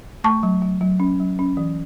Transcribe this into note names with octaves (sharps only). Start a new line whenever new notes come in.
A3 A5 C#6
F#3
F#3
F#3
C#4
F#3
C#4
E3